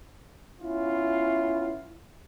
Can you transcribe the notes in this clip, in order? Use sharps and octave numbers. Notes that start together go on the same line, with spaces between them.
B3 C#4 E4 F4